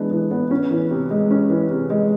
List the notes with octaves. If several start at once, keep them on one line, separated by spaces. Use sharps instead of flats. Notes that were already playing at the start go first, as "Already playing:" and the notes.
Already playing: E3 G#3 B3 D4
E3
B3
C#4
E3
C3
G#3
C#4
E3
C3
G#3